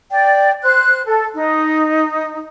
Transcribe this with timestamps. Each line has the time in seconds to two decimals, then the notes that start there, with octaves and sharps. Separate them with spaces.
0.10 D5 G5
0.63 C5 F#6
1.06 A4
1.36 D#4